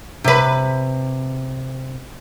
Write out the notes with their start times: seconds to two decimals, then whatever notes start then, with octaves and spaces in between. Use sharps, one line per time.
0.24 C3 B4